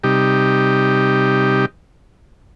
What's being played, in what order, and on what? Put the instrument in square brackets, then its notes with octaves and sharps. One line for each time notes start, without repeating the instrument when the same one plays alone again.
[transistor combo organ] C3 G3 D#4 G4